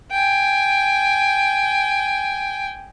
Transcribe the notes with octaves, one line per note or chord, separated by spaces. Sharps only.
G5 G#5